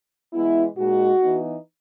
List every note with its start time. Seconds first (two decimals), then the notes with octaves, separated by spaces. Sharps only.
0.33 E3 G#3 B3 E4
0.77 A#2 G#3 D#4 F#4
1.21 E3 B3 D#4